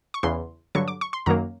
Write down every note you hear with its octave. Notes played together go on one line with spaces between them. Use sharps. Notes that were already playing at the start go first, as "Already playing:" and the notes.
C#6
E2 C#3 E3 C6
G2 D3 F#3 C#6
D6
C#6
C6
F#2 D#3 F#3 A#3 A#5